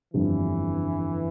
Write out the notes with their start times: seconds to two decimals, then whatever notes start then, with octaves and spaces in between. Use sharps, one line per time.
0.14 G1 F2 D3 E3 G3